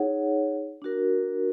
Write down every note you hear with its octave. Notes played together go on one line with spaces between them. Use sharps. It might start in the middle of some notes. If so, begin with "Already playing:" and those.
Already playing: D#4 G#4 C#5 F#5
D4 F#4 A#4